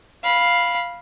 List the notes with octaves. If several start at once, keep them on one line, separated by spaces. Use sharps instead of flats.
F5 B5